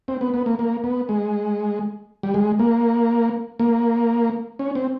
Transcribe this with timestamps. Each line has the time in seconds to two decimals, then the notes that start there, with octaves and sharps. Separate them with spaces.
0.08 C4
0.21 B3
0.34 B3
0.46 A#3
0.59 A#3
0.84 B3
1.09 G#3
2.23 G3
2.34 G#3
2.59 A#3
3.59 A#3
4.59 C#4
4.75 C4